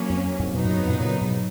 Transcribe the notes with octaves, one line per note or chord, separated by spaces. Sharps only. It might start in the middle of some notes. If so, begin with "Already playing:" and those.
Already playing: F#3 A#3 C#4
F2
F2 G#2
G#2 B2 F#3 B3 D#4
F#2 A#2
F2 G#2
F#2 A#2
A#2 C#3
G#2 B2